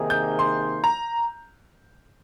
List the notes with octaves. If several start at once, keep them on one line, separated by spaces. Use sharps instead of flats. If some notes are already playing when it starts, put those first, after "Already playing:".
Already playing: C3 D#3 A#3 D#4 G#4
G6
C6
A#5